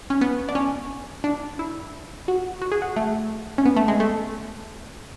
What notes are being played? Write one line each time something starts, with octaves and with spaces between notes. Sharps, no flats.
C#4
B3
D4
C#4
D4
E4
F#4
F#4
G#4
F#4
A3
C#4
B3
A3
G#3
A3